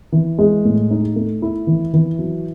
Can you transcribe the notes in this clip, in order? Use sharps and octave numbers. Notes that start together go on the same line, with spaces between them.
E3
G#3
A2
D#4
A3
E4
E3
E3
F#3